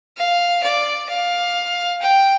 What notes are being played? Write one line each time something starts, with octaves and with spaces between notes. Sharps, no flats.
F5
D5
F5
G5